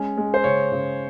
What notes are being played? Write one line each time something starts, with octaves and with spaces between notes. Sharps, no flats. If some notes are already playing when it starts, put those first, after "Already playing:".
Already playing: G#3 C#4
G#3
C5
C#3 C#5
C#3